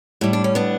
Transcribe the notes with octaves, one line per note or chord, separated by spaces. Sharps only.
A2 G3 E4
D4
C#4
B3 D4